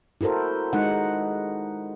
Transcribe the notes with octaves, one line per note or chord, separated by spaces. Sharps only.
E4 F#4 A4 A#4 C5
G#3 D#4 F#5